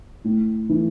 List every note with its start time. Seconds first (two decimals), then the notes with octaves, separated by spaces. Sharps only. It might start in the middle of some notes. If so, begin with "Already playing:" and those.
0.24 A2
0.69 E3 A3